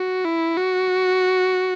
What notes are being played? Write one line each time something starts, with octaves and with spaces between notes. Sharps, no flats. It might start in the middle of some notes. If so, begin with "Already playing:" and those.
Already playing: F#4
E4
F#4